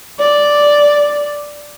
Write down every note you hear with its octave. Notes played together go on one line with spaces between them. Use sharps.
D5